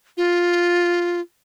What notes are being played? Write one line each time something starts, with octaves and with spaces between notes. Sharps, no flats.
F4